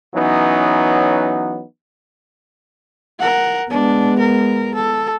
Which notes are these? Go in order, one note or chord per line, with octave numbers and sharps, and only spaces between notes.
E3 F#3 B3 C#4 D#4
A#4 F#5
G#3 B3 D4
A#4
A4